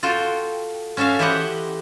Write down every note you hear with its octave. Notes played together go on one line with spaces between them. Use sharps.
F4 F#4 A4 G5
C#4 F#4 A4 E5 F5
E3 E4 G4 C5 D#5 F#5